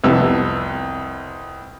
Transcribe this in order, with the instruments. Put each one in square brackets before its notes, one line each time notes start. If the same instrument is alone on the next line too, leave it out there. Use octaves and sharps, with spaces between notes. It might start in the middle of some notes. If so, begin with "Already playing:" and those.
[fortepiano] C2 F2 B3 E6